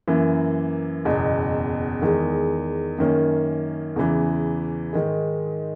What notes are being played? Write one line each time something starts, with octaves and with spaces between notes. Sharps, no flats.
F#2 E3 A#3
F#1 E2 B2
E2 D#3 G#3
F#2 D#3 A#3 C#4
E2 C#3 E3
G#2 D#3 G#3